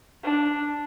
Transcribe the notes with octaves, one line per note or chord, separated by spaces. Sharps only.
D4